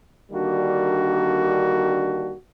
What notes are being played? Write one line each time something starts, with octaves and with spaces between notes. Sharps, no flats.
D3 D#3 G3 A#3 D4 F#4